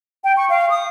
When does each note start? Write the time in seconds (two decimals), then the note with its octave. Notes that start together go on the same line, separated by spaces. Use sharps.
0.24 G5
0.37 C#6
0.49 F5
0.70 D#6